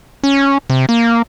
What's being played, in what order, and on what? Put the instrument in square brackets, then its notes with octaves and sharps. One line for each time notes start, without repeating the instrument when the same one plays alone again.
[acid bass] C#4
C3
A#3